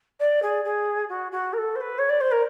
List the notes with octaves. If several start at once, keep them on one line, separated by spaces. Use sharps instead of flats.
D5
G#4
G#4
F#4
F#4
A#4
A4
C5
B4
C#5
D5
C5
A#4